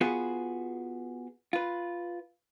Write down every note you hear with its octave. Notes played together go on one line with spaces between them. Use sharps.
B3 F4 F#4 G#4 B4
F4 B4